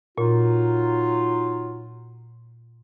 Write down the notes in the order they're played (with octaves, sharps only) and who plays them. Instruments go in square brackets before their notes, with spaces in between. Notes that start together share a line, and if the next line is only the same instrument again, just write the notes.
[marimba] A#2 [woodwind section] F#3 D#4 F4